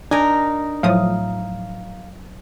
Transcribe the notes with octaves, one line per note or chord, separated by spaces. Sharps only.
D4 D#4 A#4 G#5
A2 F3 F#3 C#5 F5 D#6